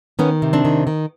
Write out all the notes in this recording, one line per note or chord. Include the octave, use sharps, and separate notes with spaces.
D#3 B3 C#4
C3
C4 D4
D#3
D#3